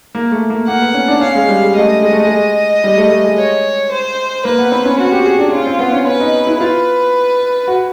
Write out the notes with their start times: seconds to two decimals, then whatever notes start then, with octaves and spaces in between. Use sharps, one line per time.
0.15 A#3
0.32 A3
0.50 A#3
0.67 A#3 F#5
0.82 B3
0.94 C#4
1.08 D4
1.21 C#4 F5
1.35 G#3
1.48 G3
1.63 G#3
1.76 A3 D#5
2.02 G#3
2.13 A3
2.25 G#3
2.84 G3
2.97 A3
3.11 A3
3.24 G#3
3.37 C#5
3.91 C5
4.45 A#3 B4
4.58 B3
4.72 C4
4.85 C#4
4.98 F#4
5.12 G4
5.25 G#4
5.39 D4
5.52 C#4 F4
5.67 C4
5.79 B3
5.92 C#4
6.06 C#4 B4
6.20 D#4
6.47 E4
6.60 F4 B4
7.67 F#4